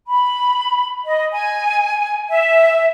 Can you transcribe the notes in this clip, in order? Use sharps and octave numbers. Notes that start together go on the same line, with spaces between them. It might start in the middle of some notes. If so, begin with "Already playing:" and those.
B5
D#5
G#5
E5